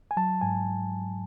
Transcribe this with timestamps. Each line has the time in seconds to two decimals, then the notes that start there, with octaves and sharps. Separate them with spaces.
0.11 G#5
0.17 F#3 A5
0.41 G#2 G#5